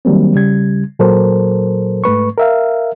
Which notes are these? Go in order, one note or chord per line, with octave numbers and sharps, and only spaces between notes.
D#3 F#3 G3 A#3 C4
C#3 G3 G#6
A#2 F#3 A4 A#4 C5
G#2 A3 B4 C#6
A#4 E5 F5